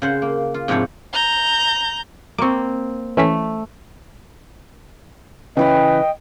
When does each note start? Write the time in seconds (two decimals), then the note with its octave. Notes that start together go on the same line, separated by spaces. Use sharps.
0.02 C#3 C5 F#5
0.22 A#3
0.54 F4
0.68 G#2 C3 F3 D4 E4 C#5
1.13 A#5 G6
2.39 A#3 C4 C#6 D6
3.17 E3 A3 C#4 B6
5.57 C#3 E3 C#4 B4 D#5 G5